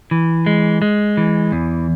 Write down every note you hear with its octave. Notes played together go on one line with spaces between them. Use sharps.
E3
G#3
G#3
E3
E2